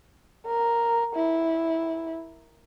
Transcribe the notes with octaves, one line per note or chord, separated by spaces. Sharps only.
A#4
E4